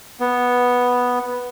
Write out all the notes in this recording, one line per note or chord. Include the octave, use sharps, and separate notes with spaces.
B3